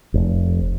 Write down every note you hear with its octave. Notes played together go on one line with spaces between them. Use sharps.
F1